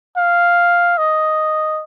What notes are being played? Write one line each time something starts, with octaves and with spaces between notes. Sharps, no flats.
F5
D#5